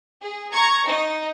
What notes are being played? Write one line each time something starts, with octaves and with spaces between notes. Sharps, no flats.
G#4
A#5 C#6 G#6 C#7
D#4